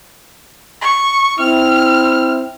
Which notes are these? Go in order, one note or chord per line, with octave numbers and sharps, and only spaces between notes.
C#6
C4 E4 F6